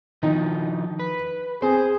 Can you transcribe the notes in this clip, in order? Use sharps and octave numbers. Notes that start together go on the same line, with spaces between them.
D#3 F3 D#4
B4
C4 G#4 C5